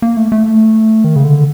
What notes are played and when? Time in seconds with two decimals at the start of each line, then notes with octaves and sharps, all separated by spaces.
0.02 A#3
0.17 A3
0.32 A3
1.04 D#3
1.16 C#3
1.24 D3